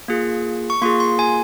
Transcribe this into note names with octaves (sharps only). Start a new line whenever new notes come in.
A#3 F4 G#4
C#6
A#3 F4 G#4 C6
C6
G#5